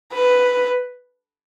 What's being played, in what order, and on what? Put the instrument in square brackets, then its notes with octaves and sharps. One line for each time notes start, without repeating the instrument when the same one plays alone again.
[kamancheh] B4